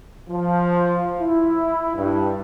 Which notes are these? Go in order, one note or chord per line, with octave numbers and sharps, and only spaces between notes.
F3
E4
G2